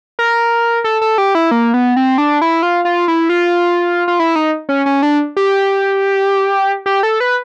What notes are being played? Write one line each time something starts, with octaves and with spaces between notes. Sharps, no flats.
A#4
A4
A4
G4
E4
A#3
B3
C4
D4
E4
F4
F4
E4
F4
F4
E4
D#4
C#4
C#4
D4
G4
G4
A4
B4